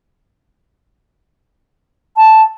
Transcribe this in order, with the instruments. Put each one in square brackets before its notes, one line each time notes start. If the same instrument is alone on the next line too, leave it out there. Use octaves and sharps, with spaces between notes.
[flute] A5